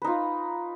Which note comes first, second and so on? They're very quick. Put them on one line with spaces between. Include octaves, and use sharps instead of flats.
B4 D#4 F4